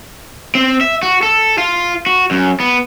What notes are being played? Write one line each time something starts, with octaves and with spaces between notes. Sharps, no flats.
C4
E5
F#4
A4
F4
F#4
F#2
B3